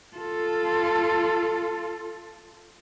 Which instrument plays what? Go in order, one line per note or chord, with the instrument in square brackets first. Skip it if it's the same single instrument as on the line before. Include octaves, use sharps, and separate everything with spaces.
[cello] F4 A4